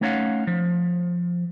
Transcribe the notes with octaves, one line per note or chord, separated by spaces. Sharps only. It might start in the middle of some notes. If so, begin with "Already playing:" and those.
A3 C#4 D#4 C#5 F5 F#5
F3